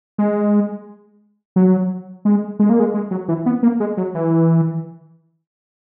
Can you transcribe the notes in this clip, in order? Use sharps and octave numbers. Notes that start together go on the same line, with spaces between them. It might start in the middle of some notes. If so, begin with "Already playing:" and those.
G#3
F#3
G#3
G#3
A#3
G#3
G#3
F#3
E3
B3
A#3
G#3
F#3
E3